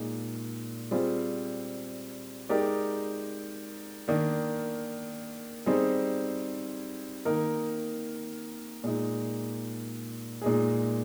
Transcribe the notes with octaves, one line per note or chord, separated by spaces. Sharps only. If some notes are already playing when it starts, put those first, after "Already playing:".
Already playing: A#2 G#3 D#4
G3 C4 F4 G#4 C5
G#3 D#4 G4 A#4 D5
D#3 A#3 D4
G3 C4 D#4 G#4 C5
D#3 A#3 D#4 A#4
A#2 G#3 D#4
A#2 G#3 D#4 G#4